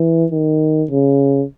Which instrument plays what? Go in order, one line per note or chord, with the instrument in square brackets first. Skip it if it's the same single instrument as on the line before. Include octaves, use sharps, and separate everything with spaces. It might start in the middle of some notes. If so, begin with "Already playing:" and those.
Already playing: [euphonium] E3
D#3
C#3